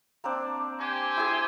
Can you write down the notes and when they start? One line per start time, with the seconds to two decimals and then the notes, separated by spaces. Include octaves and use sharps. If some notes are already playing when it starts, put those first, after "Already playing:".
0.24 A#3 C4 D4
0.79 G4 C5 G#5
1.17 E4 G#4